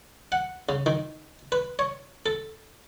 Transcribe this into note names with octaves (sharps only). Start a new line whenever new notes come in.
F#5
C#3
D#3
B4
C#5
A4